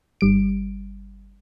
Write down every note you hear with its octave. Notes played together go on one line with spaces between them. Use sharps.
G1 G3 D7